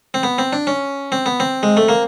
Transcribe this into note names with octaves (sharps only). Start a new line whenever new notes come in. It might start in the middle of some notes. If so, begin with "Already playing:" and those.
C4
B3
C4
D4
C#4
C4
B3
C4
G#3
A3
A#3